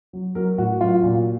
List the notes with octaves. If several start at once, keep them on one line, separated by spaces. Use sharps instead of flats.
F#3
F#3 A#4
A2 F#4
F#3 F4
A#2